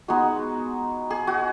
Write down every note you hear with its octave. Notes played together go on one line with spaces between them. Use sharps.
G#3 B3 D#4 F#4
G#4
F#4